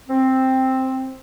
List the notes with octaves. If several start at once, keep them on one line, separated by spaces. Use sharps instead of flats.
C4